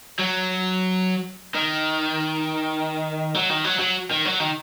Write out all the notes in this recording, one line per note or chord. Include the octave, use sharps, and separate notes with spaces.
F#3
D#3
F#3
D#3
F#3
F#3
D#3
F#3
D#3